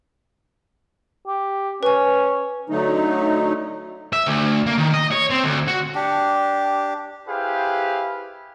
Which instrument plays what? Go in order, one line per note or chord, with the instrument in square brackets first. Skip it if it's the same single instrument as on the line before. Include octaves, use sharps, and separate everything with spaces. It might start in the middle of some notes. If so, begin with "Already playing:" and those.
[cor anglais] G4
[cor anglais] C#4 [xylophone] B4 G#5
[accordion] D3 F#3 A3 D#4
[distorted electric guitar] E5
D2
A#3
D#3
D#5
C#5
C4
D2
F#4
[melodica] D4 G4
[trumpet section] E4 G4 G#4 B4 C5 F5